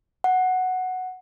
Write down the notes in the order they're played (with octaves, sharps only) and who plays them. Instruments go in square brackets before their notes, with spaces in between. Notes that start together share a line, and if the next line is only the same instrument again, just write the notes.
[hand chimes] F#5